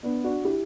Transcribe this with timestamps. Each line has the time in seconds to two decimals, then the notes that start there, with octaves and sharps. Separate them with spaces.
0.03 B3 D4
0.24 D4 F#4
0.45 E4 G4